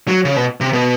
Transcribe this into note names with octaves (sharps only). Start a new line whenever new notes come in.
F#3
C#3
B2
C3
B2